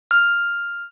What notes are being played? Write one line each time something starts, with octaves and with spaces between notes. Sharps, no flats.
F6